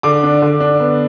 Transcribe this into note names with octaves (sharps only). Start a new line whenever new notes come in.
D3 D6
D4
D3
D4
B3